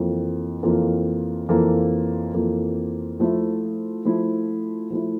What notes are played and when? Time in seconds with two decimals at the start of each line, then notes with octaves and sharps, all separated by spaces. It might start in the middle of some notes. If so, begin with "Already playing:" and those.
Already playing: F2 E3 A#3 F4 A4
0.63 F2 E3 A#3 F4 A4
1.49 F2 E3 A#3 F4 A4
2.34 F2 E3 A#3 F4 A4
3.20 F3 A3 E4
4.05 F3 A3 E4
4.90 F3 A3 E4